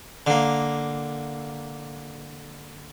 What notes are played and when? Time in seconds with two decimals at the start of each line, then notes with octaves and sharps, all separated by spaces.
0.26 D3 A#3